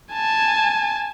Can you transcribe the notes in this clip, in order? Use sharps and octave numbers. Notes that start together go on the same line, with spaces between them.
G#5 A5